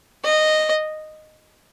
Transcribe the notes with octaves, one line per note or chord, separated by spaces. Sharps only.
D#5